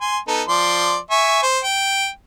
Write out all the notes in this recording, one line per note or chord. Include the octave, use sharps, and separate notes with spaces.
G#5 C6
B3 D#4 A4
F3 D5 C6
E5 G#5 C#6
C5
G5